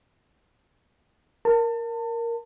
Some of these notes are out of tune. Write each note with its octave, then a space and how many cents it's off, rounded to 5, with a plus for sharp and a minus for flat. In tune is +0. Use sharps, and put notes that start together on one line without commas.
A#4 +0 A5 +35